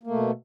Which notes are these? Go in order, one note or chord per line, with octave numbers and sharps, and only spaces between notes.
B2 A3 A#3